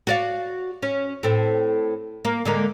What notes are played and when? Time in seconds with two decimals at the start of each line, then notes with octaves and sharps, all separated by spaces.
0.07 F#4 D5 F5
0.83 C#4
1.23 A2 C4 A4
2.25 A#3
2.45 D3 G#3 A#3